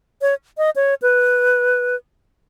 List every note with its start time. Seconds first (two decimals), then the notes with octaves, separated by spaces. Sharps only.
0.21 C#5
0.58 D#5
0.76 C#5
1.02 B4